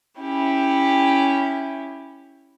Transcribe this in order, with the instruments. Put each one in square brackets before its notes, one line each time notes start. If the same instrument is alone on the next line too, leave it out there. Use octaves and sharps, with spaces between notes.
[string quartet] C#4 E4 G4